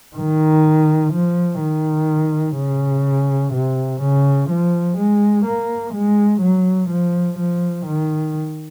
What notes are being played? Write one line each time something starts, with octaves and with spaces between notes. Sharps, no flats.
D#3
F3
D#3
C#3
C3
C#3
F3
G#3
A#3
G#3
F#3
F3
F3
D#3